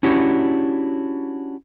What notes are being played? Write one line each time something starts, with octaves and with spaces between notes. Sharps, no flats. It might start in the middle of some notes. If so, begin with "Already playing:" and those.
C#4 D4 E4 F#4 G4 C#5